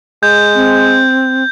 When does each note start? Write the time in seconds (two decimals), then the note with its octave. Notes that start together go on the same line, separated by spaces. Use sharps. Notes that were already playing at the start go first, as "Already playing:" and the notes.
0.23 G#3 G6
0.55 C4